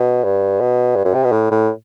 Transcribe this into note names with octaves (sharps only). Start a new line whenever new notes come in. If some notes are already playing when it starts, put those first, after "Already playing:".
Already playing: B2
G2
B2
G2
F#2
C3
B2
A2
A2